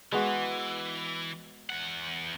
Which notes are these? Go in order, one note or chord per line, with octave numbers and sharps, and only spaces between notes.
E3 G#3 B3 F#4
E2 F#5